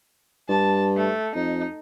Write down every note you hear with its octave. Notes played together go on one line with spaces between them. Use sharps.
G2 A5
A3
F2 D#4